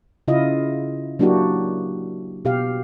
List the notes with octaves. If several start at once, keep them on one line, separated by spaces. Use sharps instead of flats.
C#3 E4 F4 D#5
F#3 A#3 D4 E4 F#4 G4
B2 G4 F5